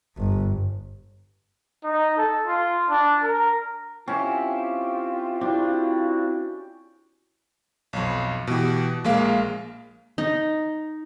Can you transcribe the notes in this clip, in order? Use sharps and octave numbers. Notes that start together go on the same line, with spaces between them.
G1
D#4
A4
F4
D4
A#4
C4 C#4 E4 F4 G4
C4 D4 E4 F#4 G4
B1 F2
B2 E3 G4
A#1 G#3 A#3 F5
D#4